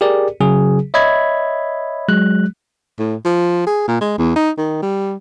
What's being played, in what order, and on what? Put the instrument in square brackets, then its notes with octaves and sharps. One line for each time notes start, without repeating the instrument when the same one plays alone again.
[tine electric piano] G4 G#4 A#4 D5
C#3 F#3 G#4
C#5 D#5 E5 B5 G#6
F#3 G#3 F#6
[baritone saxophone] A2
F3
G#4
A#2
G#3
E2
D#4
D#3
G3